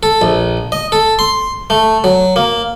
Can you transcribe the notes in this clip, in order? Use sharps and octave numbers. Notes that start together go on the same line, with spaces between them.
A4
A#1
D#5
A4
C6
A3
F#3
A#3